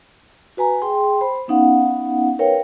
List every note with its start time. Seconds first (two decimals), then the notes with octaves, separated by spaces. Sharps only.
0.57 F#4 B4 G#5 A#5
0.82 G#4 G5 C6
1.21 C5 B5
1.48 B3 C#4 D#4 F5 F#5
2.39 A#4 B4 C#5 F5 G5